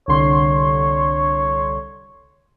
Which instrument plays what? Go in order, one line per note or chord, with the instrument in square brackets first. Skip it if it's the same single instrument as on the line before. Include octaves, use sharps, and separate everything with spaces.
[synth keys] C2 D3 C6 [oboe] C#5